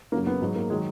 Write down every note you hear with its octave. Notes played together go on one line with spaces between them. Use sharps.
F#2 C#3 F#3 A#3
B3
G#2 F#3
A#3
D#3 F#3 G#3